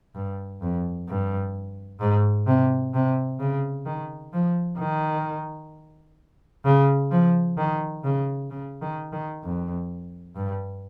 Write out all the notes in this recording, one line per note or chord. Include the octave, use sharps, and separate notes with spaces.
G2
F2
G2
G#2
C3
C3
C#3
D#3
F3
D#3
C#3
F3
D#3
C#3
C#3
D#3
D#3
F2
G2